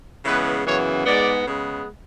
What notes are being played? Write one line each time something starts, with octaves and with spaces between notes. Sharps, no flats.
C#3 E3 G#3 B3 B4
F#2 C#3 E3 B3 C#5
G#2 G#3 B3 D5
C#3 G#3 B3